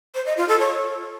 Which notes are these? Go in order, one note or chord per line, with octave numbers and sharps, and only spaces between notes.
C5
D#5
F4
A4
C#5